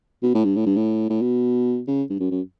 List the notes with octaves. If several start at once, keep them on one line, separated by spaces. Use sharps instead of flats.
B2
A2
G2
A2
G2
A2
A2
B2
C#3
G2
F#2
F#2